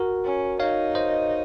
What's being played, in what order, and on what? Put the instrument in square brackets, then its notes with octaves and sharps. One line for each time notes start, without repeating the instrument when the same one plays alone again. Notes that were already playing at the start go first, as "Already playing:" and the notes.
Already playing: [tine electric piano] F#4 A#4
[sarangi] C#4
[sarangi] D#4 [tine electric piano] C#5 F5
[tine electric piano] C5 D#5